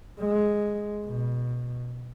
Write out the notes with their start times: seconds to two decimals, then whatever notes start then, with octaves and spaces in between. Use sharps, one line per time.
0.20 G#3
1.06 B2